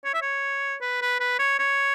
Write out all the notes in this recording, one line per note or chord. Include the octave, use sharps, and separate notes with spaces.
C#5
E5
C#5
B4
B4
B4
C#5
C#5